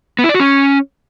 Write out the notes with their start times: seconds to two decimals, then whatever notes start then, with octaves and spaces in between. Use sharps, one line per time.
0.19 B3
0.24 E4
0.29 D5
0.34 F#4
0.40 C#4